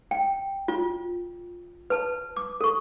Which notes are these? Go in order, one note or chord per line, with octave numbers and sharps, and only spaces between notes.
G5
F4
B4 A5
D6
A4 C#6